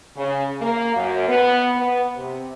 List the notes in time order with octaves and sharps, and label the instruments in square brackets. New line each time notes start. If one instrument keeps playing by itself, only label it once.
[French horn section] C#3
A#3
F#2
B3
B3
C3